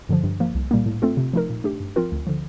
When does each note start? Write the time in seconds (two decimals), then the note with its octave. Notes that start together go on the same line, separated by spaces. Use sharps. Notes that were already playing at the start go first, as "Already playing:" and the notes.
0.09 G2 D3 F3
0.23 G2
0.40 F3 A#3
0.55 C2
0.71 A#2 G3 A#3
0.86 A2
1.02 A3 C4 F4 A4
1.17 C3
1.33 F3 A3 D#4 A#4
1.50 A#2
1.64 A3 D4 G4
1.80 G2
1.96 F3 C4 F4 A#4
2.12 D2
2.27 D3 F3